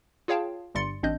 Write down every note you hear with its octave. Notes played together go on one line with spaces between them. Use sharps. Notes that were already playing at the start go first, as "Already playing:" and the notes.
F4 G#4 C#5 F5 G5 A5
G1 G2 G3 C6 A6 C#7
A1 C4 D4 D#5 G6